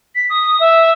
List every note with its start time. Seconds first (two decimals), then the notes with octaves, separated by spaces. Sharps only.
0.15 B6
0.30 D#6
0.60 E5